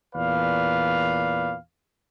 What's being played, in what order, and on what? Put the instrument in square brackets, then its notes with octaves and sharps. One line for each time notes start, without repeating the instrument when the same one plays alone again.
[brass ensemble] E2 A#2 B4 D5 F5